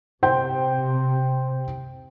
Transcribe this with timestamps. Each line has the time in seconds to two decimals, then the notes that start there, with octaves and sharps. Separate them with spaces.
0.23 C3 C5 G5